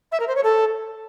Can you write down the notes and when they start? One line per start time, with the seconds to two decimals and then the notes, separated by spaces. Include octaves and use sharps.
0.12 E5
0.20 A#4
0.28 C5
0.36 C#5
0.44 A4